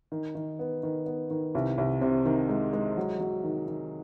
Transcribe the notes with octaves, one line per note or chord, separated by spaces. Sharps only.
D#3
D#3
B3
D#3
B3
D#3
C2
C2
C3
D#3
G#3
G#3
F#3
F#3
D#3
D#3